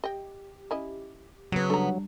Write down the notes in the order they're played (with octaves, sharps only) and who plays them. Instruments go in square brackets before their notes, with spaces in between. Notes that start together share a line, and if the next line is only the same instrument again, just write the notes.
[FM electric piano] G4 [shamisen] D#5 G5
[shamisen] C#4 E4 D#5
[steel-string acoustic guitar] C#3 B3 [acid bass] F#3
[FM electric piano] G3 D4 [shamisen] A4 A#5